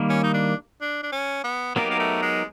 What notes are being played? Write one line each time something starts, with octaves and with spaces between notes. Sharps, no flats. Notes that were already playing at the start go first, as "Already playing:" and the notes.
Already playing: D#3 G3 A#3
C#4
D#4
D4
D4
D4
C#4
B3
F#3 A#3 B3 D#4 G4 A#4
A#3
A3
G#3